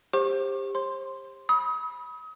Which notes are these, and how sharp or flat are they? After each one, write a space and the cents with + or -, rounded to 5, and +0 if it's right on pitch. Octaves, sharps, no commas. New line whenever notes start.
G4 +25 C5 +25 C#6 -35
C5 +35 C6 +0
B5 -15 D#6 +35